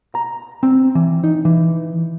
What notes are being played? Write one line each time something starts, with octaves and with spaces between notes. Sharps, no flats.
A#5
C4
E3
D#4
E3